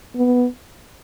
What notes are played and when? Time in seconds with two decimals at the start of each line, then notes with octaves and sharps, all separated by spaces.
0.15 B3